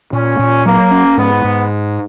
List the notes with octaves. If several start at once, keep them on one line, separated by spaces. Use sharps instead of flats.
A#2 C#4
A#2
F#3 A#3
C#4
G#2 B3
G#2